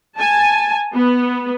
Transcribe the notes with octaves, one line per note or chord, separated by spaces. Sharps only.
G#5 A5
B3